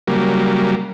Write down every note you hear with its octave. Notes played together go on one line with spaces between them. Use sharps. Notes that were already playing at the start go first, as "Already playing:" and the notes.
C#3 F#3 G3 A#3